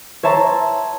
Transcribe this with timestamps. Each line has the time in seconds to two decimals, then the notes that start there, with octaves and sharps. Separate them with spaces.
0.23 C#5 E5 A5 A#5 C6